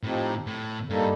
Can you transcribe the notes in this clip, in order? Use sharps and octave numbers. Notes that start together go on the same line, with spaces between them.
A2 F3 C4 D#4 G4
A2
G2 G3 A#3 D#4 A4